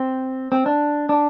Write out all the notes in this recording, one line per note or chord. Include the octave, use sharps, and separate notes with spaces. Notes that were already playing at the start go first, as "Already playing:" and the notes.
Already playing: C4
C4
D4
D4